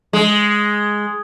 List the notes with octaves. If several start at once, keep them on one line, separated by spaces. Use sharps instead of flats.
G#3